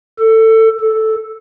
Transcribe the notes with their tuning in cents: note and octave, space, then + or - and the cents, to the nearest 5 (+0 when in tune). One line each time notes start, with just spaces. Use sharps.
A4 +20
A4 -5